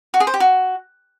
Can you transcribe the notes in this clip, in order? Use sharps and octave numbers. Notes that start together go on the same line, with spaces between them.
F#4
G#4
C5
G4
F#4